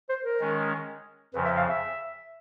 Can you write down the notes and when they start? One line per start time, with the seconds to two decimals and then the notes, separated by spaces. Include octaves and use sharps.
0.09 C5
0.24 A#4
0.40 D#3 G#3 C#4
1.34 F2 C#3 F3 B4
1.45 E5
1.56 F5
1.69 E5